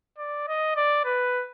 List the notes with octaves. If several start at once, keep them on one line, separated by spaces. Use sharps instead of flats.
D5
D#5
D5
B4